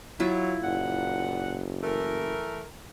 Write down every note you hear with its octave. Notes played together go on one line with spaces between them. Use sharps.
F#3 E4 F4
F#1 A#2 F#5
E3 A3 A#4